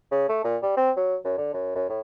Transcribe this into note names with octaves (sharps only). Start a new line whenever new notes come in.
C#3
A3
A#2
G3
C4
F#3
F#2
D3
F#2
F#2
A2